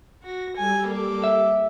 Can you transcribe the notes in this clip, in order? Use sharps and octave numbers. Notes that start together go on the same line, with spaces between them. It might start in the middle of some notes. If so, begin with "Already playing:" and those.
F#4 A#6
G3 A4 G#5
A#3 D6
E5